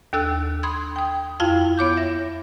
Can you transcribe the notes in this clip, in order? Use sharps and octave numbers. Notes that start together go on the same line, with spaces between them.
D#2 D4 A4 E6 F#6
B5 C6 D#6 G#6
G5 D#6
F2 E4 F4 F5 G5
B3 C#5 D6 G6
E5 A#6